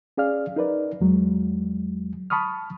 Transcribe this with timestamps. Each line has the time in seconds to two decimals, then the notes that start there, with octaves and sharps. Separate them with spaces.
0.17 C#4 G#4 D5 F5 F6
0.56 D#4 A#4 B4 D5
1.01 E2 F#3 G#3
2.30 A5 B5 C#6 D#6 F6